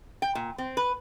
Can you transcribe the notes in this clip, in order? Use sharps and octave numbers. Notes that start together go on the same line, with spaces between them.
G5
A#2
C4
B4